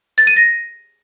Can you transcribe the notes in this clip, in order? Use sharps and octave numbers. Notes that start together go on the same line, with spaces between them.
A6
D#7
A#6